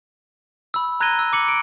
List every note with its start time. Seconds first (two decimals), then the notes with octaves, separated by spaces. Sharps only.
0.74 B5 E6
1.00 A#5 F#6 G#6 A#6 D#7 G7
1.19 E6
1.33 D6 C#7 F#7
1.48 D7